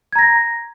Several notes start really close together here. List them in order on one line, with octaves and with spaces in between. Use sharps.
G#6 A#5 A#6